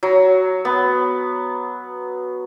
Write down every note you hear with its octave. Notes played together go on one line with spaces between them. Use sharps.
F#3
B3